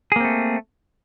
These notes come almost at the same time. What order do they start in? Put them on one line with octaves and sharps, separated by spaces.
G#4 A#3 C4 A3